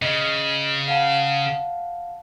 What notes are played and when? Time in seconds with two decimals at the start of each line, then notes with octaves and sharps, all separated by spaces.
0.02 C#3 D#5
0.88 F5 F#5 A5